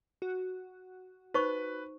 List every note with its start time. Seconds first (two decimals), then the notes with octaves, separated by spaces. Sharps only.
0.22 F#4
1.34 D#4 B4 C5 C#6